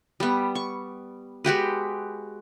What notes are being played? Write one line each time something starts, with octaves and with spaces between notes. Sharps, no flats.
G3 B3
C#6
G#3 F#4 G4 B4